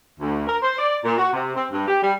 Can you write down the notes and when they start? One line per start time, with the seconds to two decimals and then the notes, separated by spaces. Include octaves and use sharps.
0.20 D2
0.48 A#4
0.62 C5
0.78 D5
1.04 A#2
1.18 F#4
1.33 C3
1.55 C4
1.71 G2
1.88 G4
2.02 G3